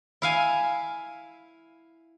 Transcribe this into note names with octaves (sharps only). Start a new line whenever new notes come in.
E4 F5 G#5